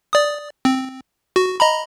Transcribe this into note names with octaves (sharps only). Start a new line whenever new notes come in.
D5 D#6
C4
F#4
D#5 A#5 B5